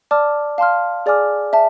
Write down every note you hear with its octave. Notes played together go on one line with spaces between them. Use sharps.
D5 A5 D6 F6
F5 A5 C6 F6
G#4 D5 G#5 D6 F6
E5 A5